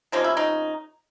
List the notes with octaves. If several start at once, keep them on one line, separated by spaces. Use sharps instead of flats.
C3 F3 A#3 C#4 D#4
E4
D#4